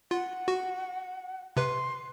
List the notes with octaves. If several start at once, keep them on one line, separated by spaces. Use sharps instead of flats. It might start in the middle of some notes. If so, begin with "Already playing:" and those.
F4 F#5
F#4
C3 B4 C6